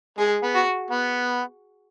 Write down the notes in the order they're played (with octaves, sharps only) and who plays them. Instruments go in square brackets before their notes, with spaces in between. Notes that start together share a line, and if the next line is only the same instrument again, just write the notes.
[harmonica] G#3 [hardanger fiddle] G#4
[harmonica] B3
[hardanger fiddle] F#4
[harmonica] B3